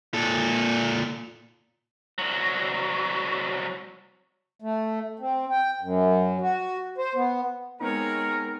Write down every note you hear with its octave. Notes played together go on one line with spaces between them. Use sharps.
A#2 A4
C2 F#3
A3
C4
G5
F#2
F#4
C5
B3
G#3 B3 C4 D#4 G#4 A#4 C#5